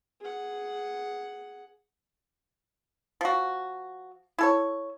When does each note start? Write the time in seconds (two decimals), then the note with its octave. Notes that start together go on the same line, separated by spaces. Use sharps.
0.20 G#4 F#5
3.21 F3 F#4
4.38 E4 A4 C#5